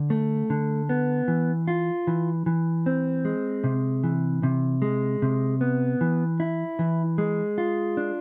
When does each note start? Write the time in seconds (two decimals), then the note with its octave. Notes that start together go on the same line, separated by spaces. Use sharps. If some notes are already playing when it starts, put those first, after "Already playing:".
Already playing: D3
0.10 A3
0.50 D3
0.89 B3
1.28 E3
1.68 F4
2.07 E3
2.46 E3
2.86 C4
3.25 G#3
3.64 C3
4.04 E3
4.43 C3
4.82 G#3
5.22 C3
5.61 B3
6.01 E3
6.40 E4
6.79 E3
7.18 G#3
7.58 F4
7.97 D4